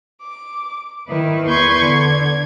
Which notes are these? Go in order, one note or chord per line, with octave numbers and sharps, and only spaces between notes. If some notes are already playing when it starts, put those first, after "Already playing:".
D6
D#3 E4 B4
E2 B4 C6 C#6 G6 G#6
D3 G#6